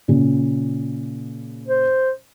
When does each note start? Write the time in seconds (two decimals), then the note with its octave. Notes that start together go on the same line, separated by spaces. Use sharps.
0.08 A#2 C#3
1.68 C5